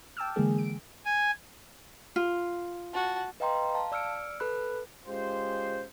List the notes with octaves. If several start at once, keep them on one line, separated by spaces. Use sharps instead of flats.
G5 A5 D6 E6 F6
D3 E3 G#3 A#3 G#4
D7
G#5
F4
F#4 A5
B4 D#5 F5 G5 A#5 C6
F5 A5
D5 E6 F6 C#7 D7
A4 B4 B5 F#6
G#3 C#4 F4 G4 C5